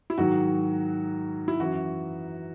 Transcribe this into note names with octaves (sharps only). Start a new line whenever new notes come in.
E4
G#2 D#3 F#3 F#4
E4
F#2 E3 F#4